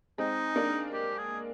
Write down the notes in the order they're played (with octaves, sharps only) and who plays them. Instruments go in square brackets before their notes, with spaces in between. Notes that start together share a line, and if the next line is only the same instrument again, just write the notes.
[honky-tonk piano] G#3 C4 [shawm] D#4
[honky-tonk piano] A#3 D4
[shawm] G4
G#4